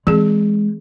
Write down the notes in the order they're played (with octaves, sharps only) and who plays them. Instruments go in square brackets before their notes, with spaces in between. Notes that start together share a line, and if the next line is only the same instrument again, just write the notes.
[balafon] E3 C4 G#4 [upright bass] G#3